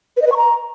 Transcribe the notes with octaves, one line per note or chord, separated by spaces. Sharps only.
B4
D#5
B4
C#6
A#5